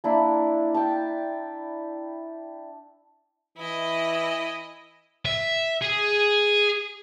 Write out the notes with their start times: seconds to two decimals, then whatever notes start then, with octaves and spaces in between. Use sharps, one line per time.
0.04 A#3 D4 E4
0.74 G5 A5
3.58 E3 E4 D#5
5.25 E5
5.82 G#4